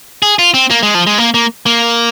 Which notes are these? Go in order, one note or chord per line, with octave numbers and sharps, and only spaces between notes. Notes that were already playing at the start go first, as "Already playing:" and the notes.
G#4
F4
C4
A#3
G#3
F3
G#3
A#3
A#3
A#3